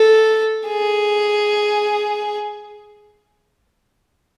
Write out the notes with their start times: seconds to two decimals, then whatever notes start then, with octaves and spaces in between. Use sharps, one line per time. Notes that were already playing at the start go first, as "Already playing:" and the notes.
Already playing: A4
0.68 G#4